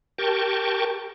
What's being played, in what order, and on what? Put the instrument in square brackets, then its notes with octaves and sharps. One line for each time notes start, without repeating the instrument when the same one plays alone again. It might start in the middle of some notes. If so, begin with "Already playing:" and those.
[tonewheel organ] G4 A#4 G5 A5 C#6